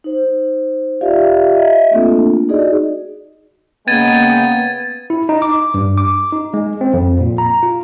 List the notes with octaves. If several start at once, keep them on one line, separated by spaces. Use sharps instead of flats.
D#4 C5
F4 G4 D5 E5 F5
D#5 E5
A3 A#3 C4 D4 F4 A4
D#4 F#4 G#4 D5 D#5
C#3 G#3 A#3 B3 G5 G#6 A6 D#7
E4
D#4
D6
G2
D6
D#4
G#3
C4
F2
A#2
A#5
F4